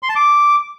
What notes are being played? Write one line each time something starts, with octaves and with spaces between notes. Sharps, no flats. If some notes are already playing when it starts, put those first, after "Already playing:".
C6
A5
D6